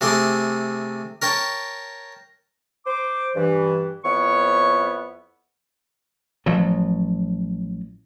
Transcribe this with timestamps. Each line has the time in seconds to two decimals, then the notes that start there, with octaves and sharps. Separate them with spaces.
0.01 C3 A3 G#4 C6 D6
1.22 A#4 C#5 G5 A5
2.86 C5 D6
3.35 G2 E3
4.05 F2 B3 E4 C#5 C#6
6.46 A1 F3 F#3